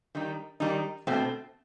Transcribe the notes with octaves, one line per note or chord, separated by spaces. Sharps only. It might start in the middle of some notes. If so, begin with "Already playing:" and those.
D#3 G3 D#4
D#3 G3 D#4
B2 A3 C4